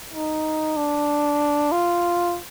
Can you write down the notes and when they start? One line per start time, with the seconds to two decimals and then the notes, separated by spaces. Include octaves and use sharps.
0.13 D#4
0.77 D4
1.72 F4